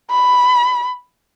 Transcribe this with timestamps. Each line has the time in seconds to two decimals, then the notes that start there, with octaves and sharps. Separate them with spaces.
0.11 B5